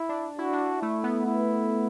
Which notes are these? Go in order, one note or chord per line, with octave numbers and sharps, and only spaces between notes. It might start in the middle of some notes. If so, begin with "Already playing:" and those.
Already playing: E4
D4
E4 F#4
D4
A3 E4
B3
E4